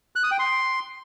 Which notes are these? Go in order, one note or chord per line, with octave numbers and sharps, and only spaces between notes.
F#6
D#6
G5
C6